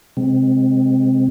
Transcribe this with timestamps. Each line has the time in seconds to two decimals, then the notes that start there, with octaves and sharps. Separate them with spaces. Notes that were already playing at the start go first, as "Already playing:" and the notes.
0.17 C3 G#3 C4